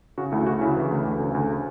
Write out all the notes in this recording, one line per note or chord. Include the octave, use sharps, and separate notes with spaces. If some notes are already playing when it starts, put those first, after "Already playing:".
C#3 F#4
D2 E4
D2 F#4
C#3 E4
E3
D2
D2
C#3
D2